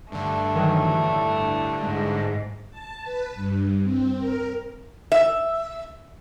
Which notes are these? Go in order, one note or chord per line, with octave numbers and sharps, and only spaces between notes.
G2 D3 A3
D#3 E3 F#3
A2
G#2
A5
B4
G2
C4
A#4
E5